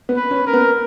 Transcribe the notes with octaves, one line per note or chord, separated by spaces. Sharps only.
B3
B4
C#4
A#4
B3